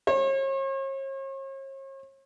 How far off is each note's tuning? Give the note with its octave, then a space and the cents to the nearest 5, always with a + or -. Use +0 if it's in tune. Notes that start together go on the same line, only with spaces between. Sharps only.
C#5 -45